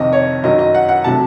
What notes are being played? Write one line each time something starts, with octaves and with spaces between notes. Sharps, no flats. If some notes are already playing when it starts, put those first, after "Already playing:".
Already playing: F2 C3 D#3 D#5
C#5
F#2 D#3 F#3 D#5
D#5
F#5
F#5
C3 F#3 A3 A5